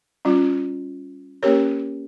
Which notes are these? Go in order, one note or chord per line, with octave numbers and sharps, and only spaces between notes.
G3 C#4 F4
A#3 C#4 G4 A#4 C#5